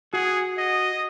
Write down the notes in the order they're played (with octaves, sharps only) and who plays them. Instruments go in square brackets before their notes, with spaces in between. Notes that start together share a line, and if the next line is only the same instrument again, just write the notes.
[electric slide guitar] F#4 F#5 [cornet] G#4
[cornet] D#5